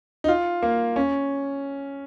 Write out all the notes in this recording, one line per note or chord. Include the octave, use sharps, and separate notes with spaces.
D#4
F4
A#3
C#4